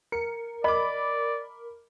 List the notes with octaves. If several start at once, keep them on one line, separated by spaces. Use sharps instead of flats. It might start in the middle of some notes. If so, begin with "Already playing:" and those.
A#4 C#7
D5 D#5 B5 D6